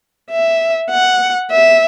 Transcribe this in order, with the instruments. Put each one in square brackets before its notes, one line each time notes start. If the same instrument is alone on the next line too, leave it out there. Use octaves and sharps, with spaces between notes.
[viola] E5
F#5
E5